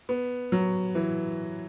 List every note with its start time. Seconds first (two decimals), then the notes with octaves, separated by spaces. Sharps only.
0.09 B3
0.52 F#3
0.95 E3